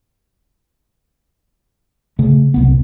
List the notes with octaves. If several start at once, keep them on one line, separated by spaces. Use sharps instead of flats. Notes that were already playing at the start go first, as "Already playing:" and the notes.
C#3 A3
D1 C2 B3